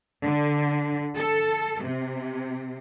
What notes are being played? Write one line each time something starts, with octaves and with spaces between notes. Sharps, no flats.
D3
A4
C3